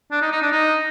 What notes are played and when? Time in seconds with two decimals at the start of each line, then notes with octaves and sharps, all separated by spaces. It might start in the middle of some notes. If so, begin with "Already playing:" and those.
0.11 D4
0.22 D#4
0.32 D#4
0.42 D4
0.52 D#4